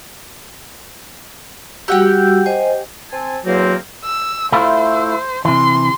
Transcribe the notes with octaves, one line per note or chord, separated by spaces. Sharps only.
G3 F#4 G4 F#5 G5 E6
C5 D#5 G#5
C4 G#5 A5
E2 F#3 A#3 C4
E6
A3 E4 F4 C5
C3 E3 C6